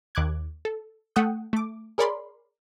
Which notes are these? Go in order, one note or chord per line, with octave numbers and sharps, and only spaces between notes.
D#2 D6 F#6 G#6
A4
A3 F#5 G5 D#6 G6
A3 D6
G#4 A#4 C#5 D5 B5 C6